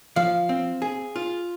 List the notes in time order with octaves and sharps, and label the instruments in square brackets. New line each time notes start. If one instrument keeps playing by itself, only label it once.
[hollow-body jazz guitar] F3 [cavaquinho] F5
[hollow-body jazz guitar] C4
G#4
F4